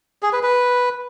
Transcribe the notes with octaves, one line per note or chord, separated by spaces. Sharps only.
G#4
B4
B4